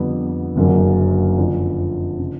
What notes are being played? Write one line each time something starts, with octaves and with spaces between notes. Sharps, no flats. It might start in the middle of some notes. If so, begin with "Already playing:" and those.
Already playing: F2 D3 G3 B3
F#1 F#2 D3 F#3 A#3
F2 D3 F3
C#3